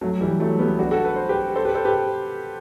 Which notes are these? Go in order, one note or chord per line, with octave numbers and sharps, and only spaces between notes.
F#3 A3
E3 G3
F#3 A3
G3 B3
D4 F#4
F#4 A4
B4
C5
G4 B4
A4 C5
G4 B4
A4 C5
G4 B4